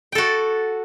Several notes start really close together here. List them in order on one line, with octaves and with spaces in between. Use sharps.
G5 A4 F#4